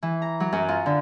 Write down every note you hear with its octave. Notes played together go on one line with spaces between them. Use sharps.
E3
A#5
F#3
F#2
F4
D3